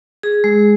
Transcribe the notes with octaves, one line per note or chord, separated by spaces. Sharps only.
G#4
G#3